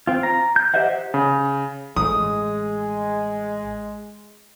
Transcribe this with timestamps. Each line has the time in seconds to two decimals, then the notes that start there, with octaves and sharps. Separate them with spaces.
0.07 C4 F4
0.23 A#5
0.56 G6
0.74 G4 C5 D#5 E5 F#5
1.14 C#3
1.96 A1 G#3 D#6